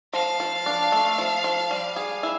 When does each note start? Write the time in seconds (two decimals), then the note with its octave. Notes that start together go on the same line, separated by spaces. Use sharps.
0.13 F3 F5
0.40 F3
0.66 D4
0.92 A3
1.18 F3
1.44 F3
1.71 G3
1.96 G#4
2.23 E4